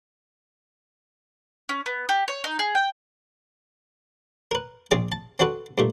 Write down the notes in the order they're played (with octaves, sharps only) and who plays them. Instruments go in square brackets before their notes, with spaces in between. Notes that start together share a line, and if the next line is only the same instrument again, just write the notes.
[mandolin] C#4
B3
G4
C#5
D#4
G#4
G5
[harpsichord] A#4 B4
A#1 C4 G#4 D5 D6
A5
C4 D4 F#4 A4 B4
G2 A#2 A3